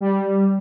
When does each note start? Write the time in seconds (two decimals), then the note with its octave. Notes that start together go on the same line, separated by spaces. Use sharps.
0.01 G3